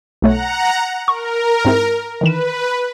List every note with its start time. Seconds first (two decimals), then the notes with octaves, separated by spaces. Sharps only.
0.22 B1 A3 C#5 F#5 A#5
1.08 A#4 C#6
1.65 G#2 C4 E4
2.21 D#3 E3 B4 E7